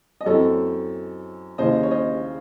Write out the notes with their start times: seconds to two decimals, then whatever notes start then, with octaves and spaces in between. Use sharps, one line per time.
0.21 D#5
0.26 F#2 E3 C4 A4 C#5
1.58 D#2 C#3 E3 C5 D#5
1.83 C#5
1.91 C5 D#5